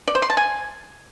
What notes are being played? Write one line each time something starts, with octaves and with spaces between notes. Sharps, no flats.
D5
C5
C6
A5
G#5